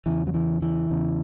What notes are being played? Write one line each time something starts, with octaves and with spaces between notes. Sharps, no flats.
E2 C#3 E3
F#3
E3
E3
E2 C#3